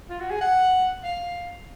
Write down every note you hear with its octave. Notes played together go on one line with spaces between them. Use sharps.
F4
F#4
G#4
F#5
F5